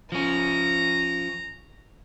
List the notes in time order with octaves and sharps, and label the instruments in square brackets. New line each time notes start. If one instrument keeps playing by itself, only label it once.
[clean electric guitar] F3 C#4 [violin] A#5